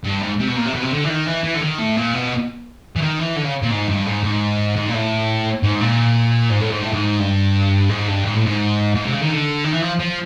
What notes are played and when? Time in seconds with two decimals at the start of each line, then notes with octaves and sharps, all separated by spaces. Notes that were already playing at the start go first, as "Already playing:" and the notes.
0.04 G2
0.22 G#2
0.40 C3
0.48 B2
0.56 A#2
0.66 C3
0.75 B2
0.82 C3
0.92 D3
1.05 E3
1.09 D#3
1.27 E3
1.44 E3
1.55 D3
1.62 D#3
1.79 A2
1.97 A#2
2.14 B2
2.96 E3
3.02 D#3
3.19 E3
3.36 D3
3.44 C#3
3.63 A#2
3.71 G#2
3.89 G2
4.06 G#2
4.23 G#2
4.76 G#2
4.89 A#2
4.93 A2
5.63 G#2
5.81 A#2
6.51 G#2
6.61 A2
6.72 G#2
6.83 A2
6.94 G#2
7.20 G2
7.89 G#2
8.08 G2
8.25 G#2
8.34 A2
8.46 G#2
8.95 G#2
9.04 C3
9.12 C#3
9.21 D#3
9.29 D3
9.64 D#3
9.73 E3
9.82 F3
10.00 F3